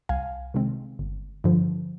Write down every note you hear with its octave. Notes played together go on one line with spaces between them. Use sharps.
C2 F5 G#5
C3 D#3 G#3 C4
G1
G2 D3 F3